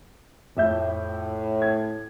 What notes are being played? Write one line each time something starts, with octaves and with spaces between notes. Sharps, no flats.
F2 A2 E5 G6
G#6